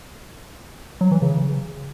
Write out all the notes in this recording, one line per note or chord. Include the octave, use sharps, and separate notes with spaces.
F#3
E3
C#3